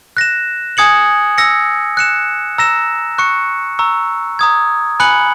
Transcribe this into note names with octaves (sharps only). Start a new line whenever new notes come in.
F#6 A#6 E7
G#5 D#6 G#6 C#7 F#7
E6 A#6 C#7
F#6 C#7 E7
A#5 E6 A#6 E7
C#6 F#6 C#7
A#5 C#6 E6
A#5 D#6 G#6
G#5 B5 F#6 C#7 F#7